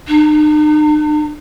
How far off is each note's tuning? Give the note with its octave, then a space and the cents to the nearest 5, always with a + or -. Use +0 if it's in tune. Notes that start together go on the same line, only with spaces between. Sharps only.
D#4 -45